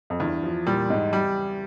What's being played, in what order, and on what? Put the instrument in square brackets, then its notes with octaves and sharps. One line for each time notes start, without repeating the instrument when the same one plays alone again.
[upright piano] F2
[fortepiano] E2 [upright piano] G2
[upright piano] F3
[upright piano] A#2 [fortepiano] G3
[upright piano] G#2
[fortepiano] G3